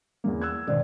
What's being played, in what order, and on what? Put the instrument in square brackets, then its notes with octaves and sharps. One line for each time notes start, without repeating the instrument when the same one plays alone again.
[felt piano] E2 E3 A#3
E6 F#6 G#6
[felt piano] G#1 D#3 C5 [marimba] B2 D5